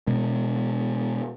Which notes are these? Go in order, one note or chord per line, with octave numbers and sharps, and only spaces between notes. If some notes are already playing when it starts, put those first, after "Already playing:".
B2 G#3